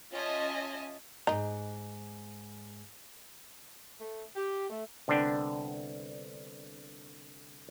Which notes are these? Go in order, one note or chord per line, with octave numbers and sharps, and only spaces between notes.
C#4 F4 D#5 E5 G#5 A5
D2 G#2 D#4
A3
G4
A3
C2 D3 B3 D4 G5